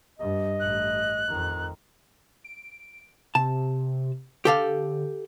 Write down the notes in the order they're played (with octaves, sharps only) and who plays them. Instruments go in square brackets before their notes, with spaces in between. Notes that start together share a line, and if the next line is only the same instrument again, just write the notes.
[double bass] G2 [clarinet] D#5
[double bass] A1 [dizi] F#6
[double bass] F2 D#3
[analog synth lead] D7
[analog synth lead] C3 [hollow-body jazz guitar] A5
[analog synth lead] D3 [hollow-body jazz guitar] G4 A4 F5